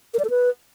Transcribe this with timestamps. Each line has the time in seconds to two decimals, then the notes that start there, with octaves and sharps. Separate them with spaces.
0.14 A#4
0.19 D5
0.25 A4
0.30 B4